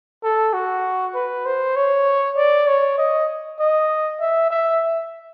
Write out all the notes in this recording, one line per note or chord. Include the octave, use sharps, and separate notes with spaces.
A4
F#4
B4
C5
C#5
D5
C#5
D#5
D#5
E5
E5